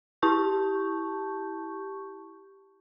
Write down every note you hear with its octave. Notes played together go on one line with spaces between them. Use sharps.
E4 G4 A5 C#6 G6